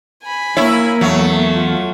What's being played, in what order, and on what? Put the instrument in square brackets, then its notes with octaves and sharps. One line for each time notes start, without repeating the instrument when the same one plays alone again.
[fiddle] G#5 B5
[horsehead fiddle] A#3 [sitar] E4 [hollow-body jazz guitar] C#5
[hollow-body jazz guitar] E2 [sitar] F#3 [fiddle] A3
[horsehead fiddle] F4